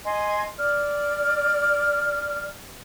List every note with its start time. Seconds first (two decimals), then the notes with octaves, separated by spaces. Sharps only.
0.06 D#5 G#5 C6
0.58 D5 F6